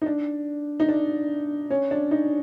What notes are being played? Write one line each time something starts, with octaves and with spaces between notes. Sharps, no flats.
D#4
D4
D#4
D4
C#4
D4
D#4